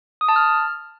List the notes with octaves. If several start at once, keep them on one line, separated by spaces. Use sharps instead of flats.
D#6
A5
F6